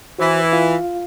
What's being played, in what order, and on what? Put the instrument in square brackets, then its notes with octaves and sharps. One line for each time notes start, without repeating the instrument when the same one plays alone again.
[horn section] E3 [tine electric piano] F#4 C5
[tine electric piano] F4 F5